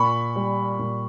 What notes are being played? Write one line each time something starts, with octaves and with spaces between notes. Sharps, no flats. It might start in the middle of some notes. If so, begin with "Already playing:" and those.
Already playing: A#2 B5 C#6
G3
A#2